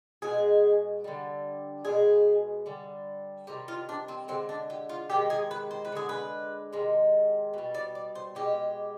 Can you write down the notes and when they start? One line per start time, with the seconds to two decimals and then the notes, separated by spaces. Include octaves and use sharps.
0.22 B2 G#3 G#4
1.04 D3 G3
1.85 B2 G#3 G#4
2.66 D3 G3
3.47 C3 D#3 G3 G4
3.68 F4
3.89 D4
4.08 C4
4.28 D3 G#3 C4
4.49 D4
4.70 G4
4.89 F4
5.10 C3 D#3 G#3 G4
5.30 G#4
5.51 B4
5.71 C5
5.85 B4
5.92 D3 G#3 G#4
6.09 B4
6.73 C3 D#3 G#3
7.54 B2 G3
7.74 D5
7.95 D5
8.15 C5
8.35 B2 G#3 G4